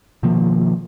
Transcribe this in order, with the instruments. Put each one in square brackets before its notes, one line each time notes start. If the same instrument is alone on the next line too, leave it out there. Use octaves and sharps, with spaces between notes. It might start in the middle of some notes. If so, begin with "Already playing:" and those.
[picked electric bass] B2 D#3 F3 A#3